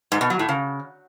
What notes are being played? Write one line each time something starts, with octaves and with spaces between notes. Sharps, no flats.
G#2
B2
F#3
A2
C#3